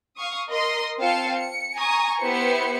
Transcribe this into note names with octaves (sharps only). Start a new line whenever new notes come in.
F5 C#6 D#6
A#4 D#5 C6
C4 F4 C5 F5 A5 C#7
C#7
G#5 A#5 C#6 D#6
B3 E4 G4 B4 C5 C#7